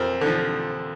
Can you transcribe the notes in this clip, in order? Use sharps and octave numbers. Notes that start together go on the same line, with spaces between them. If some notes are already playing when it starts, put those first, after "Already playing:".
Already playing: F2 A#4 C5
D3 F3